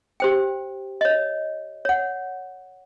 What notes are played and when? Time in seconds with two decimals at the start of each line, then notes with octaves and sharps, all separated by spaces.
0.20 G4 C5 G5
1.01 C#5 D#5
1.85 C#5 F#5